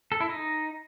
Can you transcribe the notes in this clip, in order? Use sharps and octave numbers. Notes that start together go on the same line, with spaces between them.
A4
E4
D#4